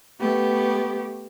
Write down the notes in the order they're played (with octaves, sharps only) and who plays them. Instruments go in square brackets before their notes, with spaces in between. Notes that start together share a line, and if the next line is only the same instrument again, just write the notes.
[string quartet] A3 B3 G4